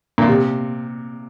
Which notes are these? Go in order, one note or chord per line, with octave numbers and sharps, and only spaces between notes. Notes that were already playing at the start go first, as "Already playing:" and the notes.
A#2
C3